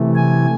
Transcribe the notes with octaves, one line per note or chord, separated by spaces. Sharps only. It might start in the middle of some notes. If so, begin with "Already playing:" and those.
Already playing: C3 E3 A3
G#5